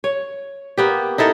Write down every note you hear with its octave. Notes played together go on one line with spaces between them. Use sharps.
C#5
A#3 B3 G4
D#4 E4 A4 A#4